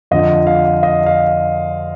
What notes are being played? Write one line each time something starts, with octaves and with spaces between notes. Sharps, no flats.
F2 D3 F3 D#5
F5
D#5
F5